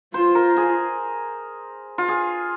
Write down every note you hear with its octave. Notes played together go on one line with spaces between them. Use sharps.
F4 C5
A#4
G#4
F4
G#4